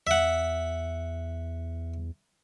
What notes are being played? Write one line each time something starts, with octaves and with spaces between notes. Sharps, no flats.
E2 E5 F#5